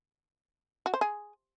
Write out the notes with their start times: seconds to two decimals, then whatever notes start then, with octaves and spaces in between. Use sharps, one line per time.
0.86 F#4
0.94 C5
1.01 G#4